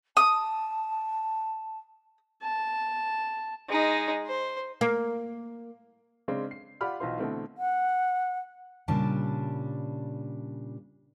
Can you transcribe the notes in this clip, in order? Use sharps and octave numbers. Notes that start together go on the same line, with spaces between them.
A5 D#6
A5
G#3 D#4
C5
A#3
C#3 G#3 C4 D4
C7
F4 G4 D5 F#5 B5 F6
B1 E3 D#4 F4 C5 C6
B2 D3 E3 A3 C4
F#5
A#2 C#3 G3 D4 A5